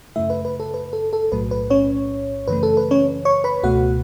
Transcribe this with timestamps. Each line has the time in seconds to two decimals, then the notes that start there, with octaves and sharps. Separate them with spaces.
0.16 F#2 C#3 A3 E4 E5
0.30 B4
0.45 B4
0.60 A4
0.74 B4
0.93 A4
1.13 A4
1.32 B1 A2 F#3 A3 B4
1.51 B4
1.70 C#4 C#5
2.48 F#2 C#3 E3 A3 B4
2.63 A4
2.77 B4
2.91 C#4 C#5
3.25 C#5 C#6
3.44 B4 B5
3.63 C#2 B2 A3 F#4 F#5